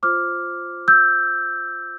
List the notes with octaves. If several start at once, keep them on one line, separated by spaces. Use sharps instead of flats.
F4 C5 D6 F6
E6 G6